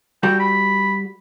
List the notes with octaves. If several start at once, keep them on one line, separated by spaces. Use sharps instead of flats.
G3 F#4 A4 G5
B5